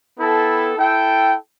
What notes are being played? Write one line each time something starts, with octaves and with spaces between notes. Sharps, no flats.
B3 E4 A4 G5
E4 A4 G5